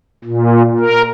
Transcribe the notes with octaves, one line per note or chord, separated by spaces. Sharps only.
A#2
A#4